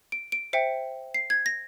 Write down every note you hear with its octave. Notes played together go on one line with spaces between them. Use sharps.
D7
D7
C5 E5 G5 C#7
C7
G#6
A#6